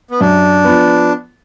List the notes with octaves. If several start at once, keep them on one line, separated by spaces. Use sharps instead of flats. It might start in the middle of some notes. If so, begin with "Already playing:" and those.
B3
F#2 D4
F3 B3